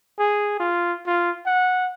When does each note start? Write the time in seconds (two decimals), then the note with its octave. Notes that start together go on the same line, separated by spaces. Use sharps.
0.19 G#4
0.60 F4
1.06 F4
1.46 F#5